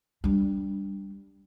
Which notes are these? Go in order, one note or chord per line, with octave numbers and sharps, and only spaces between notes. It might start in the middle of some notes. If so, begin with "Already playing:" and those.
G3 D4